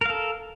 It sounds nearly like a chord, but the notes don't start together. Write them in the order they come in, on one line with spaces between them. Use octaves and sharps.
A#4 F5 A4